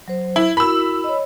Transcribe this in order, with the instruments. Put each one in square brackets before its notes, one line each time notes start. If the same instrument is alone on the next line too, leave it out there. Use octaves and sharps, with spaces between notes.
[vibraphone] F#3 C5
[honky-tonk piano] E4
[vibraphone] E4 F#4 A#4 [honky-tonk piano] B5 E6
[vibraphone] C#5 D#5